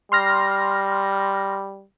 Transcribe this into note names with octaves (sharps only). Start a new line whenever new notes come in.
G3 C6 F6 A#6